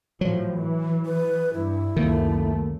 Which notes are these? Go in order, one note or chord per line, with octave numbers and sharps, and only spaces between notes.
A2 F3 F#3
E3
B4
G2 E4
C#2 F#2 D#3 A3 A#3